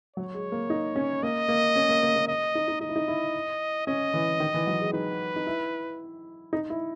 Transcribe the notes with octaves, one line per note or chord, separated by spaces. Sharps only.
F#3 C#5
G#3
A#3
D#4
C#4
A#3 D#5
A#3
C#4
A#3
A#3
A#3
D#5
D#4
D#4
D#4 D#5
E4
D#4
E4
C#4 D#5
E3
D#3
E3
F#3
G#3
D#4 B4
D#4
E4
D#4
E4